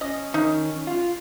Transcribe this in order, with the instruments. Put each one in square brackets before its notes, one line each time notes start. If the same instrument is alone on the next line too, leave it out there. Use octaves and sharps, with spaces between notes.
[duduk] C#4 [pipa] D#5
[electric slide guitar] D#3 [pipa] D#4
[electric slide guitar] F4